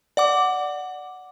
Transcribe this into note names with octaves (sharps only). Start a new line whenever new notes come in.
D5 F#5 D6